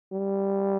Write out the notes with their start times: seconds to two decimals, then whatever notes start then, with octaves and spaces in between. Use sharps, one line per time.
0.12 G3